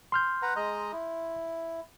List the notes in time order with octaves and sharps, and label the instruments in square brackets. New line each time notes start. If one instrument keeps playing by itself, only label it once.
[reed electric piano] C6 F6 G6
[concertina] B4 F#5 A#5
G#3 D#5 A#5
E4